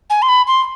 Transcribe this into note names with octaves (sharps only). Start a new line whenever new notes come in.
G#5
C6
B5
C6